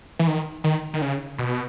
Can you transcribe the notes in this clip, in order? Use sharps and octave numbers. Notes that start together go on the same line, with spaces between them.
E3
D#3
D#3
D#3
C#3
B2